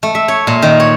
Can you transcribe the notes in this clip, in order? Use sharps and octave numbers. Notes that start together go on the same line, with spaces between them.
A3
E5
C#5
A#2
D#3
C#5